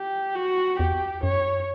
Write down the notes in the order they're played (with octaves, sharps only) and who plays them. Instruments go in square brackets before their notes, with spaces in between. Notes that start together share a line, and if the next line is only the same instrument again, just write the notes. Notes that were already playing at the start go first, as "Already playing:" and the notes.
Already playing: [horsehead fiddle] G4
F#4
[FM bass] E2 [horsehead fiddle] G4
[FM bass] F#2 [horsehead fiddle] C#5